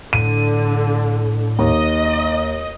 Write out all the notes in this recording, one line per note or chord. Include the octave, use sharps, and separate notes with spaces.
A2 D3 D#7
D#2 D#5